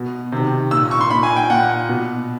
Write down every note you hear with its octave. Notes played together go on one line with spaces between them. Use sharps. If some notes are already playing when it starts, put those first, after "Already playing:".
Already playing: B2
C3 D#3
A#2 E6
C#6
C6
A#2 B5
G#5
G5
A#2 F#5
B2